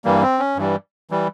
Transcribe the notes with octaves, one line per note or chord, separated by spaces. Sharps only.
G2 E3 G3 A#3
C4
C#4
G2 E3 G3
E3 G3